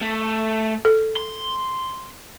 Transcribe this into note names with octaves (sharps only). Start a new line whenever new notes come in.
A3
A4
C6